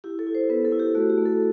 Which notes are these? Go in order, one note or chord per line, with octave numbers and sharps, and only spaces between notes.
E4 G4
A4
E4
C5
B3 B4
A4
E4
G4
A3 F#4
G4
A3
A4